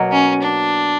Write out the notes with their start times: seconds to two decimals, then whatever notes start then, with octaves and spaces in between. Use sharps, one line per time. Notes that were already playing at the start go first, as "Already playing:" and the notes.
Already playing: B2 F#3 A#3
0.12 C#4
0.42 D4